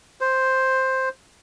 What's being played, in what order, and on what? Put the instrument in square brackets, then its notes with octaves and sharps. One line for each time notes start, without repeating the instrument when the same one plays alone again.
[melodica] C5